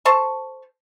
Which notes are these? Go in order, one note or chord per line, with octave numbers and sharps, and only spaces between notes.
A4 C5 A5 C#6